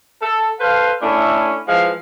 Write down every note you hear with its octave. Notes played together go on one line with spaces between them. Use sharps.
A4
A4 B4 C5 F5
A3 C#4 D4 E4
E3 F3 G#3 F5